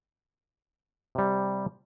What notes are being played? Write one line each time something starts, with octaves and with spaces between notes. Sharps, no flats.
C3 G3